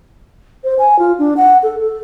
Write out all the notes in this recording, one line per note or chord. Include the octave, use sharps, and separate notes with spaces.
C5
G#5
F4
D4
F#5
A4
A4